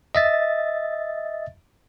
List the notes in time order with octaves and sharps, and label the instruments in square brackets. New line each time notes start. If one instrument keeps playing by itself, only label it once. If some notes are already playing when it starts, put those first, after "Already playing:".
[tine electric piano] D#5 E5 A6